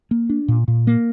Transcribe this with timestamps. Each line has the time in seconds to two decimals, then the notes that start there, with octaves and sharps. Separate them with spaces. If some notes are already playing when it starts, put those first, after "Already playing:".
0.11 A#3
0.29 D4
0.48 A#2
0.68 A#2
0.87 A#3